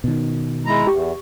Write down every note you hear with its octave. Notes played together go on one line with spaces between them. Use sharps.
B2 D#3
G#3 E4 A#5
E2 G4 C#6